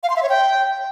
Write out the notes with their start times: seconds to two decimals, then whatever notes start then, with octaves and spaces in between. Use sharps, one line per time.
0.03 F5
0.10 C6
0.16 E5
0.23 C#5
0.29 G5